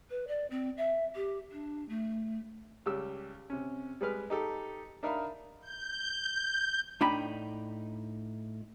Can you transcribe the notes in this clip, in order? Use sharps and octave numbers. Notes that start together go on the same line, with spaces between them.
B4
D5
C4
E5
G4
D4
A3
C#2 G3 G4 E6
C3 C#4
G3 G#3 B4 F6
D#4 G4 A4
D4 D#4 A#4 E5 F5 B5
G6
A2 D4 D#4 G5 B5